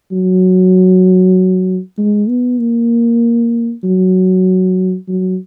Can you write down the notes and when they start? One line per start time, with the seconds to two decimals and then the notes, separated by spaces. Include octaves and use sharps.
0.12 F#3
1.98 G#3
2.29 B3
2.60 A#3
3.84 F#3
5.08 F#3